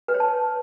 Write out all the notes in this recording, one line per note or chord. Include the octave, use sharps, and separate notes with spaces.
B4
C#5
A5